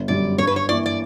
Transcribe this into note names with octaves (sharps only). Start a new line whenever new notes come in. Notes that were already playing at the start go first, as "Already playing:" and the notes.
Already playing: G1
F#2 D3 G3 D5
G2 C#5
B4
C#5
E3 A#3 E4 D5
D5